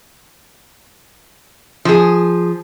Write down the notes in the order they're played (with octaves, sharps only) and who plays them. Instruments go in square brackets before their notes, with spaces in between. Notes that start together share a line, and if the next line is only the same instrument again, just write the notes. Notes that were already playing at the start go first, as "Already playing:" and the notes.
[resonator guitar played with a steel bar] F3 G#4